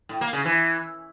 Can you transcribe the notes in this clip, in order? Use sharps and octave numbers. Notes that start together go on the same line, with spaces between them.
A2
A#3
C#3
E3